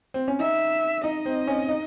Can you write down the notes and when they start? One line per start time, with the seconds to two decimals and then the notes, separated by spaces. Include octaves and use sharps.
0.14 C4
0.28 C#4
0.40 D#4 E5
1.04 D#4 D#5
1.26 C4
1.47 C#4
1.69 D#4